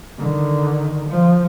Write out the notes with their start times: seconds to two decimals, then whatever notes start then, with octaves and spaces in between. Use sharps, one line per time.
0.19 D3 D#3
1.09 F3